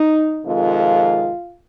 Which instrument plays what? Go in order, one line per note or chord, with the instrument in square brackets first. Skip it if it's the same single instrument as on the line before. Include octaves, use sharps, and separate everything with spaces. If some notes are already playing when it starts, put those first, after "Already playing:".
Already playing: [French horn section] D#4
F2 C3 D#3 G#3 F4